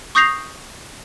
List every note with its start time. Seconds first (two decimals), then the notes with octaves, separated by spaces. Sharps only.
0.15 C#6 D#6 G6 A#6 C7 F7